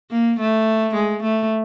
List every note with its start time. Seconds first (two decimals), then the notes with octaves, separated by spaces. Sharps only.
0.11 A#3
0.39 A3
0.95 G#3
1.23 A3